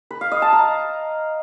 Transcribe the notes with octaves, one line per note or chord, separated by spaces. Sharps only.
B4
F5
D#5
A5
A#5